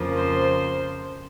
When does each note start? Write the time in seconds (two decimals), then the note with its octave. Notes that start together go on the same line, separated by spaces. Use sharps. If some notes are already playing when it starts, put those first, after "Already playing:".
Already playing: F2 C#3 F3 A#3
0.15 C5